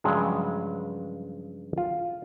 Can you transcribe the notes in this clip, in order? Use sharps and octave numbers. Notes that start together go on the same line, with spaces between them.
G2 C#3 F3 F#3 G#3
F4